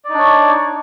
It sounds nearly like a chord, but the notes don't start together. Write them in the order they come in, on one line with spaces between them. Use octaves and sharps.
D5 D#4 D4 C#5